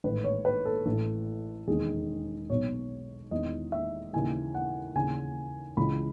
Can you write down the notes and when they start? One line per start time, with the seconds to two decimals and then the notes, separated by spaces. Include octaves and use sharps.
0.04 A1 G#2 D#3 B4
0.24 C#5
0.45 B4
0.65 A4
0.86 A1 A2 E3 A4
1.68 E1 D#2 D#3 G#4
2.50 B1 B2 C#5
3.31 E1 E2 D#3 D#5
3.72 E5
4.13 D#2 C#3 E3 G#5
4.55 F#5
4.95 D#2 C#3 E3 G#5
5.77 C#2 C#3 E3 B5